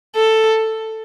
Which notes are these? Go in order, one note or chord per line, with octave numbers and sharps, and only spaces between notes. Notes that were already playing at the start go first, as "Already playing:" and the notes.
A4